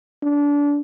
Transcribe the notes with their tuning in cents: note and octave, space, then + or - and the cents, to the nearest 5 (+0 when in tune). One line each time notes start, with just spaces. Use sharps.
D4 -25